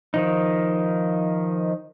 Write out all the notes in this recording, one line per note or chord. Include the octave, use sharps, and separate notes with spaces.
D#3 F3 D#4